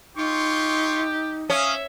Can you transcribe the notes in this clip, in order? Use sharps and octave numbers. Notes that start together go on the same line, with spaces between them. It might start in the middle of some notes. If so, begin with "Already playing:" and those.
D#4 F4 G4 C6 C#6
C#4 C#5 E5 F5 D#6